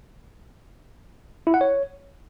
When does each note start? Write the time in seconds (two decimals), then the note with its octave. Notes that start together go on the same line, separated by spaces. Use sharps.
1.47 E4
1.54 F#5
1.61 C#5